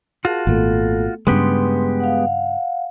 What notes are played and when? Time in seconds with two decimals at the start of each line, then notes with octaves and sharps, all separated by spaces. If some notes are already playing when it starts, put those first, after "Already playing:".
0.25 F4 F#4 G#4 A#4 A5
0.47 G#1 A#2 A3 B3 A4
1.27 G2 C#3 G#3 A3 B3 G4 B4 C6
2.00 F5 F#5